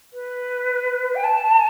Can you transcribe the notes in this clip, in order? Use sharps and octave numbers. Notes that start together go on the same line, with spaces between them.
B4
G5
A5